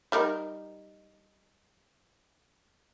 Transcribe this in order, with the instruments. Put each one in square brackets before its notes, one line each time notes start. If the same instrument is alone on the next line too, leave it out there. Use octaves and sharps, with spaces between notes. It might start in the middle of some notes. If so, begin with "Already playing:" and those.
[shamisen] G3 D#4 A#4